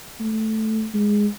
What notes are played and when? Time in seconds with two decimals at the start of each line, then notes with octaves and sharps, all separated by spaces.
0.20 A3
0.94 G#3